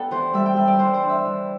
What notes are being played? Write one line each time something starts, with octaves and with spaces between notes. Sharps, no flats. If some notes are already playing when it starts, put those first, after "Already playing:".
Already playing: B3 D4 G4 A4
E3 C5
G3 E5
G5
G3 E5
D5
E3 C5
C5
D4
E5
E3